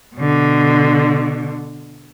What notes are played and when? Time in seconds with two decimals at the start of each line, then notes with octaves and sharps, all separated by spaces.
0.16 B2 D3